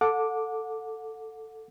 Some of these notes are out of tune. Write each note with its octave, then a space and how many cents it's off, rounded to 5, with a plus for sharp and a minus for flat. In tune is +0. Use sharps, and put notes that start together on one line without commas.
A4 +5 F#5 -30 D6 +0